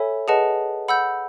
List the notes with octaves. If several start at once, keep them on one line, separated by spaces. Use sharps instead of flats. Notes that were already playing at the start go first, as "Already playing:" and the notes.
Already playing: A4 C#5 E5 G#5 B5
G#4 B4 D#5 F#5 A5
F#5 B5 E6 G6